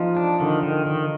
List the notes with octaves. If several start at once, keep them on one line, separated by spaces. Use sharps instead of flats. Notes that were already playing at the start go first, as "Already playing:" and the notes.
Already playing: F3 D#4
D4
D3 D#3
D#3
D#3